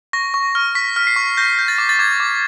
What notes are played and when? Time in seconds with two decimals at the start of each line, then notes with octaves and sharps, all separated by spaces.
0.13 C#6 A#6
0.34 C#6
0.55 F6
0.75 C#6 B6
0.96 F6
1.07 C7
1.16 C#6
1.37 G6 A#6
1.59 G6
1.68 A6
1.78 D6
1.89 A6
1.99 D6 G#6
2.20 D6